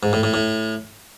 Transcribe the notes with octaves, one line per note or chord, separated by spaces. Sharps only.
G#2
A2
A2
A2